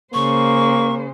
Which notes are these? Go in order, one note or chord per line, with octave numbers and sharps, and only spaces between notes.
C#3 A#3 C5 C#6